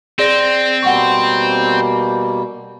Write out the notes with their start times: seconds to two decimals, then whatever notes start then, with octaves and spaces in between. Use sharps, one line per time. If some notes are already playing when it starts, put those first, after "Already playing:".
0.19 C4 G#4 D5 A#6
0.83 B2 G3 A#3 F#5 G5 C#6